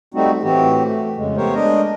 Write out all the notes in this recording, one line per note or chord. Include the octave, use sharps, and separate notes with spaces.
G3 A3 C4 D#4 F#4
A2 E3 C4 F#4 G4
A3
F2 C#3 G#3
A3 B3 G4 A#4 C5 C#5
G#3 D4 A#4 D#5